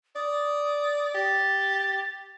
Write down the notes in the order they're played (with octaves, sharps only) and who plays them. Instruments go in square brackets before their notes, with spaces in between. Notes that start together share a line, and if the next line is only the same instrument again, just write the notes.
[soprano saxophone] D5 [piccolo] D#6
[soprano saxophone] G4 [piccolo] A6